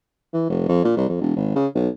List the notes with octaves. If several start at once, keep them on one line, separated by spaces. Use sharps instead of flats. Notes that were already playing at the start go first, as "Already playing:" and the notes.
E3
F1
F2
A#2
C2
F2
E1
G#1
C#3
B1